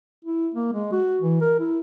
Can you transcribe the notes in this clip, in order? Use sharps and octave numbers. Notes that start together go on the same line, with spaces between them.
E4
A#3
G#3
F#4
E3
A#4
E4